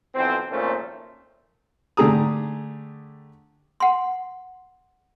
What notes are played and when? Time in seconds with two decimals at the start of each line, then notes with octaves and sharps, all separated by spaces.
0.15 B1 F2 E3 C4
0.51 G#1 F2 A#2 A3 C#4 C5
1.97 D3 A3 G4 G#4 A#5 D#6
3.80 F#5 C6